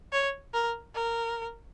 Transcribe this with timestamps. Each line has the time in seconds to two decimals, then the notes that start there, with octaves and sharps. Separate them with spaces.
0.13 C#5
0.54 A#4
0.95 A#4